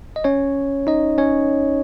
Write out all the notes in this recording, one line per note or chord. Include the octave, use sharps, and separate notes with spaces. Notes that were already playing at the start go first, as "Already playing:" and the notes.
D#5
C#4 C#5
D#4 D#5
C#4 C#5